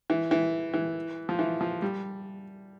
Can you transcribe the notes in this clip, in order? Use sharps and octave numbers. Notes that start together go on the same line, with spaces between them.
E3
E3
E3
F3
E3
F3
G3